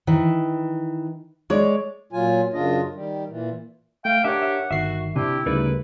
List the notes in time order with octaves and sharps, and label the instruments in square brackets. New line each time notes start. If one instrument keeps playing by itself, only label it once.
[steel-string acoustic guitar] D#3 E3
G#3 C#5 D5
[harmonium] A#2 F#3 F4 G#5
F#2 C#3 D4 F4 D#5
D#3 G3
A#2 E3
[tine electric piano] A3 [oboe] F5 [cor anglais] G5
[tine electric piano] D4 A#4 C#5 [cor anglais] G4 [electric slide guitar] E5 [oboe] F#5
[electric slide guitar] E5
[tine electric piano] G1 D#3 C7 [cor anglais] F#4 [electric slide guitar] E5
[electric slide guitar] C3 [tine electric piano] C4 D4 [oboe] E4 [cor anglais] G4
[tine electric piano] D2 C#3 G3 [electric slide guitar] D#4 A#4 D5 [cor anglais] B4